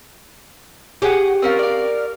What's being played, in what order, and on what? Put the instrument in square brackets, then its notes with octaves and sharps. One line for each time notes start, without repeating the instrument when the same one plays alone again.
[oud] G4 [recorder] G#4 [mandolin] C#5 F#5
[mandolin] C4 C#4 F4 [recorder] A#4
[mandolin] D5 F5